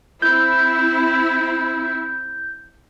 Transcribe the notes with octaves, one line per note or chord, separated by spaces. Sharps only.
C4 E4 G6